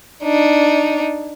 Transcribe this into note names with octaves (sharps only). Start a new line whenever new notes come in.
D4 D#4